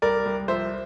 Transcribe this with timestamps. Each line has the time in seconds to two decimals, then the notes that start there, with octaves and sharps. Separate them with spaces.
0.02 C2 A#4 D5
0.25 C2
0.48 F3 C5 E5